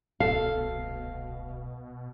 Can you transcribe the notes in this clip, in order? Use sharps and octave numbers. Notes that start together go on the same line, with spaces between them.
D1 C2 B2 A4 F5